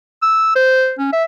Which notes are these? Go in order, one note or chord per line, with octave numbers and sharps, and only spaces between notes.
E6
C5
C#4
E5